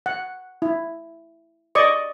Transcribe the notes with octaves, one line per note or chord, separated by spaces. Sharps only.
F#5
E4
D5 D#5 C#6